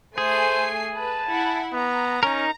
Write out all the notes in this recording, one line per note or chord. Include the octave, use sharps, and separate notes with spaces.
A3 G#4 C5 G#5 C7
B4 A5
E4 F#5 B5
B3 A#5
C#4 D#4 A#4